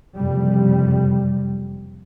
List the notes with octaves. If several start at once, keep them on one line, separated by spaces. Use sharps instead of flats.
F#1 F2 C3 G3